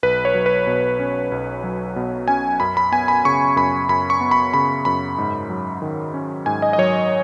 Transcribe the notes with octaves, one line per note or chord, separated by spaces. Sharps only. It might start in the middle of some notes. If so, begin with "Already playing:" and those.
B1 B4
C#5
F#3
B4
B2
C#4
B1
F#3
B2
C#4 G#5
F#2 B5
B5
B3 G#5
B5
C#3 C#6
F#2 B5
F#2 B5
C#6
B3
B5
C#3 B5
F#2 B5
G#2
F#3
D#3
C#4
G#2 G#5
D#5
D#5
F#3 C#5